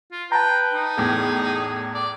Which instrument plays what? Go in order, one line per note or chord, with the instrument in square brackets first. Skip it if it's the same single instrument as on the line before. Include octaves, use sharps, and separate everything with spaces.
[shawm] F4
[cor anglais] B4 [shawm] G5 [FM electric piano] A5 A#5
[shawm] D#4
[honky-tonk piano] E2 A2 [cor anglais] G#4
[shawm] D5